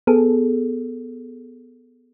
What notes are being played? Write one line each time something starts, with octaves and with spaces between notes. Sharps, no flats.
B3 G#4 A4